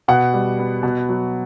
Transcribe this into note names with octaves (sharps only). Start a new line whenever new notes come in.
B2 F#5
G3
B3
B2
F#3